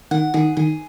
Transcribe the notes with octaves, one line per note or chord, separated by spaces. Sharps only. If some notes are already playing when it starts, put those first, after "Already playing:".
D#3 F#5
D#3 G#4
D#3 G#4